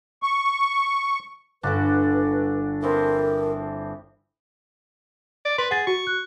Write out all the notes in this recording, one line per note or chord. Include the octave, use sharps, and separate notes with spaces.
C#6
G1 D4 F#4 A4 B4
E3 F3 C4 A#4
D5
B4 C6
G#4 F#5 A6
F#4 C#6
F#6